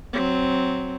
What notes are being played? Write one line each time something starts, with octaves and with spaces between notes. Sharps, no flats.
F#3 C4